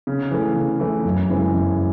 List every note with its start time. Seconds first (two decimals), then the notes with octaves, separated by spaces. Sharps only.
0.07 C#3
0.31 E3 A3
0.56 C#3
0.80 E3 A3
1.04 F#2
1.28 C#3 E3 G#3
1.53 F#2